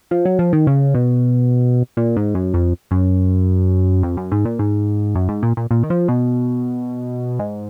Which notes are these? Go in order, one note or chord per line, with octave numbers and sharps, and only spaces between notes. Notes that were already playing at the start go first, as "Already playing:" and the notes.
F3
F#3
F3
D#3
C#3
B2
A#2
G#2
F#2
F2
F#2
F2
F#2
G#2
A#2
G#2
F#2
G#2
A#2
A#2
A#2
D#3
F3
B2
G#2